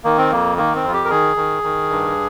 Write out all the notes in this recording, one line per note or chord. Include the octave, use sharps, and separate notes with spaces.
D#3 A#3
C4
F2 A#3
D#3 A#3
C4
F2 F4
G4
A#4
D#3 G#4
D#3
D#3
G2